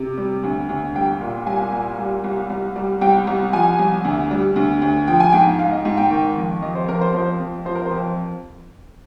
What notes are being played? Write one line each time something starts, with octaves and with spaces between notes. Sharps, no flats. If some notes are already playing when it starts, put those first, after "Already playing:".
Already playing: C3
G3
D2
D2
C2 G5
A#2
C2 G#5
A#2
G3
C2
C2
G3
C2 G5
C2
F3 G#5
C2
D2
G3
D2
D2
F3 G5
G#5
G#2 G5
G#2 F5
D#5
G#2
G5
D#3 G5
F2
F2 D#5
C5
F2 A#4
C5
F3 C5
F2
F3 C5
A#4
C5
F2